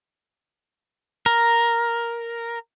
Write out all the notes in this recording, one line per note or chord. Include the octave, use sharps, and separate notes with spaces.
A#4